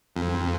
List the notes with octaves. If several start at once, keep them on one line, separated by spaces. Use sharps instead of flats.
F2